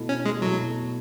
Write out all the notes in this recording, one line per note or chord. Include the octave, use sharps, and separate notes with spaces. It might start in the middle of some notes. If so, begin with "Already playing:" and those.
Already playing: B2 A3 E4
C#4
G#3
B2 F#3 A3 E4